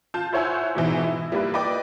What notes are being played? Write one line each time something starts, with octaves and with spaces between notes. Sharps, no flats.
F4 A5 G6
E4 C5 C#5 F#5 G#5 E6
G#2 B2 E3
E4
G3 A#3 E4 B4
B4 D5 D#5 G5 D6